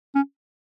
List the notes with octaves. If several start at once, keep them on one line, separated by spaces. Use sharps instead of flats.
C#4